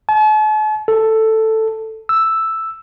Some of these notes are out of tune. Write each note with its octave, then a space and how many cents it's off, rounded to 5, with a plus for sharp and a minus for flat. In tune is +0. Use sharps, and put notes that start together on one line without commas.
A5 -45
A4 +5
E6 +0